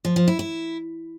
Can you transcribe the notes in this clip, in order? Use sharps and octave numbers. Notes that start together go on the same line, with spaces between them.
F3
F3
E4
E4